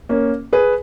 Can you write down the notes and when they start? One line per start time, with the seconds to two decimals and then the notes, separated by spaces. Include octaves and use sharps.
0.09 A#3 C#4
0.53 G#4 B4